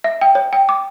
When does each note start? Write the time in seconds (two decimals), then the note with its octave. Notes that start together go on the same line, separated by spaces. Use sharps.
0.04 E5
0.21 G5
0.35 C#5
0.53 G5
0.69 D6